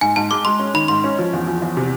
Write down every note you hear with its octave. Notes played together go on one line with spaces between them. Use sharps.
G#2 G#5
G#2 A5
G#3 D6
G#3 C6
C#4
D#3 B5
G#2 C6
C#4
F3
E2
F3
E2
C3